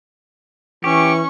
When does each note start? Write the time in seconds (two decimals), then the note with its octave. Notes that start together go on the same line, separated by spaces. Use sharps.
0.84 E3 C#4 G4 C#6